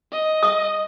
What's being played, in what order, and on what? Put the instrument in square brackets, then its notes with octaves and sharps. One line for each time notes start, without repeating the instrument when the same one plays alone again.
[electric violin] D#5
[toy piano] D#6